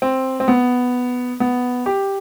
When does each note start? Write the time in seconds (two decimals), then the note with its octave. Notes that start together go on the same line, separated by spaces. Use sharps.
0.02 C4
0.40 C4
0.48 B3
1.40 B3
1.86 G4